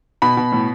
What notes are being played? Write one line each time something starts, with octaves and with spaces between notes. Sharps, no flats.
B2 B5
B2
A2